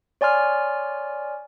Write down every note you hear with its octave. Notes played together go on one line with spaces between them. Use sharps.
C#5 D5 G#5 C6 F6